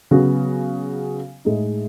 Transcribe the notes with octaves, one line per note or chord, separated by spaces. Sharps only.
C#3 F#3 B3 F#4
A2 G#3 D#4